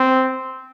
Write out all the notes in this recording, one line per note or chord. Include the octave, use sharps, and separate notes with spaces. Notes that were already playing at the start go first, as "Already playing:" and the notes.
Already playing: C4